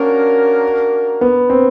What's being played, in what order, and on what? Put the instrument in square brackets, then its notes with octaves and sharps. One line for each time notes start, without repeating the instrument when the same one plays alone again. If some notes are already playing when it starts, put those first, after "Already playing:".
Already playing: [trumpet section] A#3 D4 F#4 A#4 [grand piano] C#4
[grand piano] B3
C4